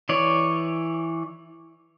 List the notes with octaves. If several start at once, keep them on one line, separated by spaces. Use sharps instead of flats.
E3 C#5 D5